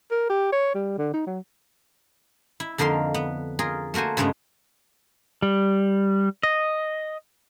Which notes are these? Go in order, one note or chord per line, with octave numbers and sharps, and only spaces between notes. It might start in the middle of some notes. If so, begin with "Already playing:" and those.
A#4
G4
C#5
G3
D3
D#4
F#3
E4
F2 D3 A#3 D#4 F5 C6
B3
F4 G#4 A#4
A3 A#3 F#4 C5 G#5
G2 C#3 G#3 A3 B3
G3
D#5